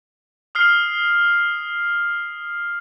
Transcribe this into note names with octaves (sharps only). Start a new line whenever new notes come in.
D#6 F6 C7